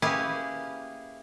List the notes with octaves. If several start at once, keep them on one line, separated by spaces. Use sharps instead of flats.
A#3 C#4 E4 G4 G#4 B4